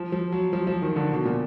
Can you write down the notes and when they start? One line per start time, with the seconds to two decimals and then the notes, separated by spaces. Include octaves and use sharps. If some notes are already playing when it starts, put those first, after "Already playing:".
Already playing: F3
0.12 F3
0.32 F#3
0.53 F3
0.67 F3
0.82 D#3
0.96 D3
1.11 B2
1.25 A#2